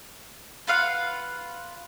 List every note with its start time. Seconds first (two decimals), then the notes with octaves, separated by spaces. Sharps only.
0.67 F4 B4 F5 F#5